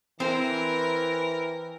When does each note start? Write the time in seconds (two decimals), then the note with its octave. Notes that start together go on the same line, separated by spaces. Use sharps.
0.20 E3 C4 A#4 C5